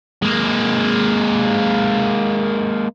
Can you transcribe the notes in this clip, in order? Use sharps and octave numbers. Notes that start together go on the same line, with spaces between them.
G#3 A#3